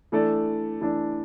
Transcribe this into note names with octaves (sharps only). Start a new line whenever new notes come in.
E3 A3 D4 A4 D5
E3 A3 D4 A4 D5